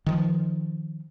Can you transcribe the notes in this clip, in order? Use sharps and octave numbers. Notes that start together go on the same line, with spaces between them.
D#3 F3